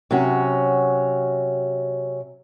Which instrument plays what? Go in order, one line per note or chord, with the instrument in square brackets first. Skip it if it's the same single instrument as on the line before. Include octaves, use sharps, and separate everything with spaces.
[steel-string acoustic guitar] C3 F#3 C#4 F#4